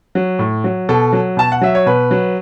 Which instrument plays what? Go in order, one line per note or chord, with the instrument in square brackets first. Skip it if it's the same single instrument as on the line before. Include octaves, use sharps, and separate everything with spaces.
[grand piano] F#3
A2
F#3
B2 A4
F#3
B2 A5
F#5
F#3 E5
C#5
B2 B4
F#3